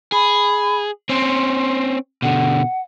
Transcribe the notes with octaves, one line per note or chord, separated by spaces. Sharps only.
G#4 B5
C4 C#4 C6
B2 D3 F#5